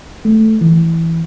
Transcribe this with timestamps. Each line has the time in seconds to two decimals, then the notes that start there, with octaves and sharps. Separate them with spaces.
0.25 A3
0.61 E3